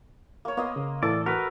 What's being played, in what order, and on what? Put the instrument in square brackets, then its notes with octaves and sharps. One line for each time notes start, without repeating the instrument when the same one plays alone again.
[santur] A#3 C#5
[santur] A#3 D#5 C6 [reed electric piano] B3
[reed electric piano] C#3
[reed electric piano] A2 E3 [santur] A4 [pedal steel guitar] D5
[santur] F#4 [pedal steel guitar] A#4 B4